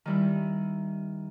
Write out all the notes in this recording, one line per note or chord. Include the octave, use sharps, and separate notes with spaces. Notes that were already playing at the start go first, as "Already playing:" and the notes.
D#3 G3 E4